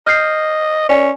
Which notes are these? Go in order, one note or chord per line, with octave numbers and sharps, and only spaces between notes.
D#5 F6 G6 C7
C#4 D5 G#5